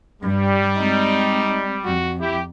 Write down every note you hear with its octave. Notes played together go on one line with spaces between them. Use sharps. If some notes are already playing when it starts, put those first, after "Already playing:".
G2 G3
G#3 C4 D#4
F2 F#4
E4 G4